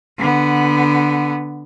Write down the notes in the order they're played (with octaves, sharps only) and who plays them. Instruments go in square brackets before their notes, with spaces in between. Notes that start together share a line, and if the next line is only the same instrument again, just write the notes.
[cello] D3 B3